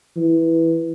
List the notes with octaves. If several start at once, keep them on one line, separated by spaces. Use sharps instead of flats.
E3